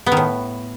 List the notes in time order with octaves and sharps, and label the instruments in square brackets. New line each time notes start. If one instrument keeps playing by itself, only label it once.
[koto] B3
D#3
A2